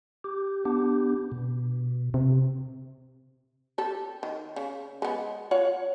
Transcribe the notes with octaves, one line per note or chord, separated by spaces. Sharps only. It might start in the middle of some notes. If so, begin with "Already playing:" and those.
G4
B3 D4 G4
B2
C3
G4 A4
D#3
C#3
G#3 B3
F4 C#5 F#5